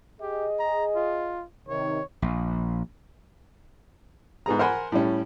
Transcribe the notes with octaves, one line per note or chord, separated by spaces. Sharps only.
G4 G#4 D#5
A#5
F4
C3 D#3 C#5
A#1
G#2 B3 G#4 A#5
A#4 C5 F#5 G#5 B5 C6
A2 G3 C#4